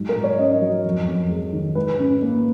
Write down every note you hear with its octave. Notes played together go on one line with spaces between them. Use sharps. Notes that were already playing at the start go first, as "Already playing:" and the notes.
Already playing: G#2 F#3
A#4
G#2
C#5
C#4 D#5
F#3
F2
F2
G#3
D#3
G#2 B4
C#4
A#3